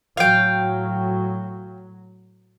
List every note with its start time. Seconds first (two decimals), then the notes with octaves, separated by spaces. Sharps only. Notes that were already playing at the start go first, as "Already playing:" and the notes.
0.17 A2 F#3 F5 G5